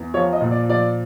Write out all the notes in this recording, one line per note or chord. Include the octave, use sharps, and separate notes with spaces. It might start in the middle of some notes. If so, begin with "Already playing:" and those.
Already playing: E2
F3 C#5
D#5
A#2
D5
F3 D5